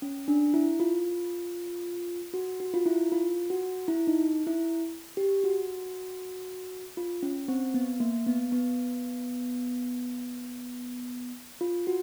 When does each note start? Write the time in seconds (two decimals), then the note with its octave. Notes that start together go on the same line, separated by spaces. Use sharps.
0.02 C#4
0.28 D4
0.54 E4
0.80 F4
2.34 F#4
2.60 F#4
2.74 F4
2.86 E4
3.12 F4
3.50 F#4
3.88 E4
4.07 D#4
4.47 E4
5.17 G4
5.44 F#4
6.97 F4
7.23 C#4
7.48 C4
7.74 B3
8.00 A#3
8.27 B3
8.52 B3
11.61 F4
11.87 F#4